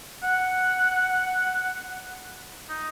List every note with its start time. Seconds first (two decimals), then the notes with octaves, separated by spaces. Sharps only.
0.23 F#5
2.69 D#4